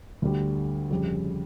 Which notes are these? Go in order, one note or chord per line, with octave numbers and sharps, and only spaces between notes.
D2 D3 G3
F2 C#3 G3